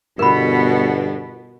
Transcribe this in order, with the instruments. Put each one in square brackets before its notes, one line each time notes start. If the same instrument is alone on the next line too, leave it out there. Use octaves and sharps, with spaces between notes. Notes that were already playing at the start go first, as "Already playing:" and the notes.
[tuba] G1 [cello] B2 B3 [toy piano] A#4 B5